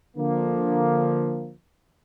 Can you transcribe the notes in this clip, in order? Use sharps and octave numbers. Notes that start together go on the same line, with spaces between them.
D3 F3 A#3